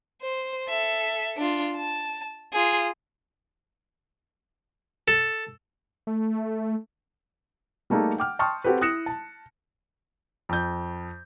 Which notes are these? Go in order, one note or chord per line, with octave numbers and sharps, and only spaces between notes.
C5
A4 E5
D4 F4
A5
F4 G#4
A4
A3
G3 A3 A#3 D#4 G#4 A4
F#5 G5 D6 F6
G5 A5 C6 C#6 D#6 F6
C4 F#4 G4 A4 B4
E4 D#6 F#6 A#6 C#7 E7
A5
F2 G6